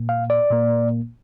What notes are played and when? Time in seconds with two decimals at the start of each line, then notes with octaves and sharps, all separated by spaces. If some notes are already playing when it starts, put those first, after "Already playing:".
Already playing: A#2 A#3
0.09 F5
0.30 D5
0.50 A#2 A#3